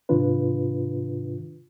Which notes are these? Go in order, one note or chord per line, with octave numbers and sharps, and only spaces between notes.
G#2 C3 D#3 D4 F4 B4